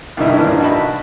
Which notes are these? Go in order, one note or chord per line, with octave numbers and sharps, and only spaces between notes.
C2 G2 D3 D#3 D#4 E4
A1 G2 F3 A#3 D4
D#4 F#4 E5 G5 A5 B5